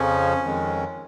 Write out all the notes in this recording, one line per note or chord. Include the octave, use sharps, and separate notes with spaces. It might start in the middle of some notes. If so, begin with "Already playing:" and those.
Already playing: F2 C#3 F3 C#4
F2 D#3 G#3